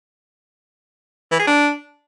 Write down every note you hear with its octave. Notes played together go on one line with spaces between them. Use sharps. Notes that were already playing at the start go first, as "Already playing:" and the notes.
E3
G#4
D4